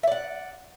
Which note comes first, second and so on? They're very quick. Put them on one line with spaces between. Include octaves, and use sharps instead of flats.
E5 D5 F#5